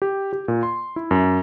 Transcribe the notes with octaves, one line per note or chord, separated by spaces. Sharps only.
G4
G4
A#2
C6
E4
F#2